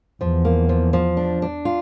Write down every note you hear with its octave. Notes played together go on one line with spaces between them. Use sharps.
E2 F3
A#3
F3
F3
D4
D4
F4